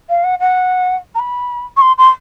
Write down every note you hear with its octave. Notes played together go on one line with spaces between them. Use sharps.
F5
F#5
F#5
A#5
B5
C#6
C6
C6